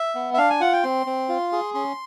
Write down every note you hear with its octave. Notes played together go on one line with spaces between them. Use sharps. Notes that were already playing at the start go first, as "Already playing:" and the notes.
Already playing: E5
B3
E5
D4 F5
G#5
F4 F#5
G5
C4 C6
C4
F4
G#4
C#4 C6